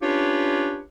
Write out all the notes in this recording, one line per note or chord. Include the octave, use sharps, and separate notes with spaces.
C#4 D4 F4 G4 B4 C#5